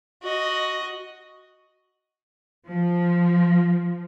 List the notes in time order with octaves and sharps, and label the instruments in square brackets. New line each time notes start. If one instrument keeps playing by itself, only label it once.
[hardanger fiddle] F#4 D#5
[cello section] F3